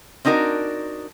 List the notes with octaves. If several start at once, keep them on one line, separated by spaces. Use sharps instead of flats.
C4 D4 D#4 F#4 A#4